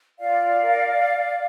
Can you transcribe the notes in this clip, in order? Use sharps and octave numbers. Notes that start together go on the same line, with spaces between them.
F4 D5 F5
A#4